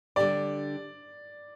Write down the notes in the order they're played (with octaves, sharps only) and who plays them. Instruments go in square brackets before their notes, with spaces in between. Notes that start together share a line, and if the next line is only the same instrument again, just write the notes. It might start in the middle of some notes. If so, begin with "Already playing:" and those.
[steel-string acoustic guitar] D3 G3 D4 G4 [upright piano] D5